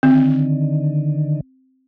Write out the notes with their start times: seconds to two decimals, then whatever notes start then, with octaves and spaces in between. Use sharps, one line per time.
0.03 D3 D#3 C4